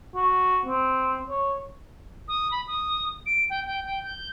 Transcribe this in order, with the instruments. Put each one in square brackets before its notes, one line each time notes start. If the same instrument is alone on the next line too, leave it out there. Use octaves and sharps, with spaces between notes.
[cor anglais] F#4
C4
C#5
[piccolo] D#6
B5
D#6
D7
G5
G5
G5
G6